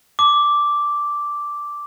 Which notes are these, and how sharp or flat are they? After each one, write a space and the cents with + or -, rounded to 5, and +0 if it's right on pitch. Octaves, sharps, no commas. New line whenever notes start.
A5 +0 D6 -5